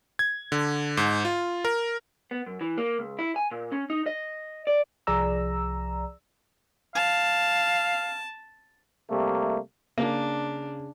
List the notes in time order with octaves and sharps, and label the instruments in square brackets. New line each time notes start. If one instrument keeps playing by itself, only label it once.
[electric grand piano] G#6
D3
G#2
F4
A#4
[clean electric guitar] B3
F#2
E3
A#3
C#2
E4
G#5
A#2
C#4
D#4
D#5
D5
[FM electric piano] C2 F3 G#4 D5 A#5 E6
[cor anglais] F5 [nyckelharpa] A5
[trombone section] C3 G3 A3 A#3
[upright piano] C#3 [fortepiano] A#3 [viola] D4